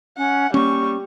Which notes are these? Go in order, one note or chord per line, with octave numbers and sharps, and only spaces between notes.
C#4 F#5
G3 A#3 C#4 C#6